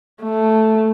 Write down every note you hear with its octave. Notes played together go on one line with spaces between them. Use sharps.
A3